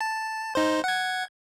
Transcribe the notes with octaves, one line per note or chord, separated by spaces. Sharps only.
A5
D#4 C5
F#5 G#6